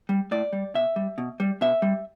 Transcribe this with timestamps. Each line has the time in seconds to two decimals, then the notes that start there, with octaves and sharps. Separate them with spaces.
0.09 G3
0.31 A2 D5
0.53 G3
0.74 B2 E5
0.96 G3
1.18 B2
1.40 G3
1.61 B2 E5
1.82 G3